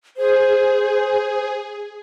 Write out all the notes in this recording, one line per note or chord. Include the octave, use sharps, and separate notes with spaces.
G#4 C5